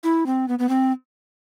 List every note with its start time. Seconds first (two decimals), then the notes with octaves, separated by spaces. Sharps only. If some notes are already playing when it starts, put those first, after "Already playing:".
0.04 E4
0.26 C4
0.48 B3
0.59 B3
0.69 C4